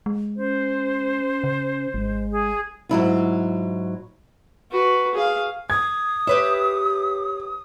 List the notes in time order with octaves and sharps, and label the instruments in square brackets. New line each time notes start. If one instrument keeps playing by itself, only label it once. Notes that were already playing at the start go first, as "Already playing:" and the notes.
[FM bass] G#3
[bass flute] C#4 [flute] C5
[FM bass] C#3
[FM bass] G#1 [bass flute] G#3
[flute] G#4
[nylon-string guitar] G#2 F#3 E4 F4
[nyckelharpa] F#4 B4
G#4 F5
[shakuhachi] D#6 [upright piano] G#6
[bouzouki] G4 B4 E5 [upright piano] C#5